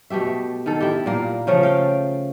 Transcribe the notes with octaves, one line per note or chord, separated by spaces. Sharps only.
B2 A3 G4 E5
D#3 A4
E4 G4
A#2 A#3
C#3 F3 A3
F5 G5